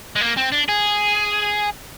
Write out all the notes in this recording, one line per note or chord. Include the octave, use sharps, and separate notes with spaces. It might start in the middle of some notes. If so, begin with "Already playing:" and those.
G#3
A#3
C4
D4
G#4